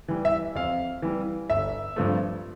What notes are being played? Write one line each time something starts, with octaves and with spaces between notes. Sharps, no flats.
E3 G3
E5
F2 F5
E3 G3
G1 E5
G2 F3 A3